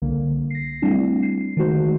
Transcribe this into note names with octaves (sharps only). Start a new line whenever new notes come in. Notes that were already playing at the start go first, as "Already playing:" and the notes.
C2 D3 A#3
A#6 C7
G3 A3 C4 D4 E4
C7
D#3 G#3 A3 F#4 C5